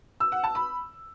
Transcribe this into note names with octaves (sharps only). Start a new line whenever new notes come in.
E6
F#5
A5
B5